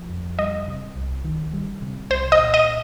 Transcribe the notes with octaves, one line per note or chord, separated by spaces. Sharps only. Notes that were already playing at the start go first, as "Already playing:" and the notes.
Already playing: F3
F2
G3 D#5
C3
C2
D#3
G3
C3
C2 C5
D#5
A#2
D#5